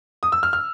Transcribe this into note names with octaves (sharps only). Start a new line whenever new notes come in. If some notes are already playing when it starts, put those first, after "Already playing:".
D#6
E6
F6
F6